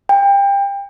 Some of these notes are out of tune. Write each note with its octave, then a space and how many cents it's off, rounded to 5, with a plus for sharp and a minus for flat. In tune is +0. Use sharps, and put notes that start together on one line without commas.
G5 +25